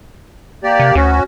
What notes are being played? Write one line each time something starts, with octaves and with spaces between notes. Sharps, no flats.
A#3 G4 D5
C3
D2 C#4 F#4